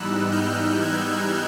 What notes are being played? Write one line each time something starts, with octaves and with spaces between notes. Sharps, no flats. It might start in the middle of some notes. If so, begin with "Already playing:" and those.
Already playing: G#2 E3 G3 B3 D#4 E6 F#6
F6 G6
F#6 G#6